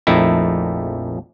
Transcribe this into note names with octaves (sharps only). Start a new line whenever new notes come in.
A#1 F2 A3 D#4 E4